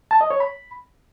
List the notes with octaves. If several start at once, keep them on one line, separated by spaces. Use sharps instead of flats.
A5
D#5
C#5
B5